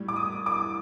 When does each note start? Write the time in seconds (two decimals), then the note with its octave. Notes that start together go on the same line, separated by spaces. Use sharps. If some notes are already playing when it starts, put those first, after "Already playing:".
Already playing: A2 G3
0.08 D6
0.16 D#6
0.46 D6